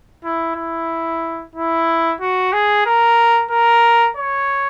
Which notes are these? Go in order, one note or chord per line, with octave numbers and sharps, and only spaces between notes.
E4
E4
E4
F#4
G#4
A#4
A#4
C#5